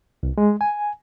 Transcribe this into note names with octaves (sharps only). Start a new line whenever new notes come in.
C2
G#3
G#5